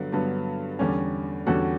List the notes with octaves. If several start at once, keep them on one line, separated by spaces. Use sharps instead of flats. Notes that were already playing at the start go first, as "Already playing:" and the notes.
Already playing: G2 D3 F#3 B3
G2 D3 F#3 B3
E2 D3 G3 C#4
E2 D3 G3 C#4 F#4 A4